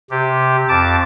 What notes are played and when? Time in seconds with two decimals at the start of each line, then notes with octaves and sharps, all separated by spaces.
0.10 C3 G4
0.69 F2 A5 D6